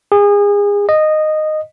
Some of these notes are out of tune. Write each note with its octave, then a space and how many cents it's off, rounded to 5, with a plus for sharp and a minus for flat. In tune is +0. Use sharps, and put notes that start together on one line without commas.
G#4 -30
D#5 -10